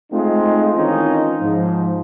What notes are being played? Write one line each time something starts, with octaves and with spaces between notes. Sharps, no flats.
G#3 A3 C4 D#4 F4
D#3 E3 C4 C#4 D#4 F4
G#2 F3